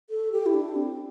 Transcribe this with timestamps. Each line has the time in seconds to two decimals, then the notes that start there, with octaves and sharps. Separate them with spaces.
0.10 A4
0.32 G4
0.46 E4
0.54 D4
0.76 C4